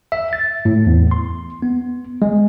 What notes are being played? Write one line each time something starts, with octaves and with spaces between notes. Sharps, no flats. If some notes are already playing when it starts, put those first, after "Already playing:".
E5
A6
A2
E2
C6
B3
G#3